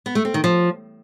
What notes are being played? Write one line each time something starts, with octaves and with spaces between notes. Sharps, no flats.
B3
A3
C4
D#3
F3